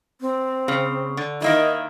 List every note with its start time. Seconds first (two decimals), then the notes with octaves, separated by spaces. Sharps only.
0.21 C4
0.68 C#3
1.17 D3
1.42 D#3 A#3 E4 D#5